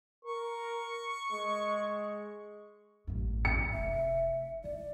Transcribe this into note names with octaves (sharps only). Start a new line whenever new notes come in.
A#4 C#6
G#3
A1 F#2
C#7
F1 E5
E3 D5